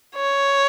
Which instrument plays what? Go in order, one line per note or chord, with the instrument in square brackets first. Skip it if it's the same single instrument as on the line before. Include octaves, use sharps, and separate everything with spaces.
[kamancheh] C#5